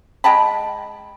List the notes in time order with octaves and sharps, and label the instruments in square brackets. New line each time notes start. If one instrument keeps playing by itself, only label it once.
[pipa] G#3 G5 A5 B5